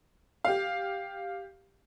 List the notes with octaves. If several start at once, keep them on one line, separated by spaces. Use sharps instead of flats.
G4 F5